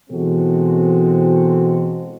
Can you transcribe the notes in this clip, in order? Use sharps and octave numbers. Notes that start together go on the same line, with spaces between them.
B2 E3 G#3 C4 F#4 A4